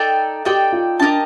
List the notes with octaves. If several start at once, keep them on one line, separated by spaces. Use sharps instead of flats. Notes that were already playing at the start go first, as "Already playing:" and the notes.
Already playing: D#4 A4 D5 G5
D#4 G4 A4 D5 G5
F4
D4 G4 A#4 D#5 A5